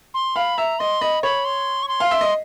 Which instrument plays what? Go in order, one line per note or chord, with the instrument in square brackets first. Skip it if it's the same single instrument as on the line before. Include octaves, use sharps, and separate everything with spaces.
[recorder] C6
[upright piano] F5 [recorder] B5
[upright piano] E5 [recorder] A#5
[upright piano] D#5 [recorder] C6
[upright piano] D#5 [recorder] B5
[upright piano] C#5 [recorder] B5
[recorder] C6
C#6
C6
[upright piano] F5
E5
D#5